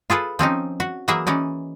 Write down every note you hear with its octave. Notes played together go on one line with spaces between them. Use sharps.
F4 G#4 A4 B4
F3 C4 C#4 D#4
F#4
E3 F#3 A#3 G#4 E5
E3 C#4 D#4 D5